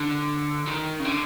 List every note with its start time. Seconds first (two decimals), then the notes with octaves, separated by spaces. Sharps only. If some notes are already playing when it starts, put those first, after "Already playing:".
Already playing: D3
0.67 D#3
0.99 C#3
1.05 D3